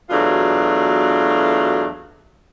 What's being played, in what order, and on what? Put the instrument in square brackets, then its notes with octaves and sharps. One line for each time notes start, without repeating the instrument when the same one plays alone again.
[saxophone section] E2 B2 F#3 A3 D4 F4